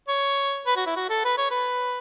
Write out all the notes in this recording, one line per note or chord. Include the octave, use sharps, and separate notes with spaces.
C#5
B4
F#4
E4
F#4
A4
B4
C#5
B4